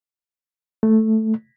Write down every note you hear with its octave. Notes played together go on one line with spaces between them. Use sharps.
A3